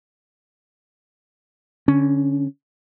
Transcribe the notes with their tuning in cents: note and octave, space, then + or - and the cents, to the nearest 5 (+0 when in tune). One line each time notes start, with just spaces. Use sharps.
D3 -20 C#4 +0